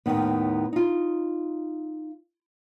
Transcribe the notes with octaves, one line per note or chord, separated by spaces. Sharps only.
D#2 A2 C3 D#3 B3
D#4 F4